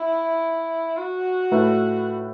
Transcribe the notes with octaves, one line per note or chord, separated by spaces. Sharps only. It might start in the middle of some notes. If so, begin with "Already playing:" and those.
Already playing: E4
F#4
A2 A3 E4 B4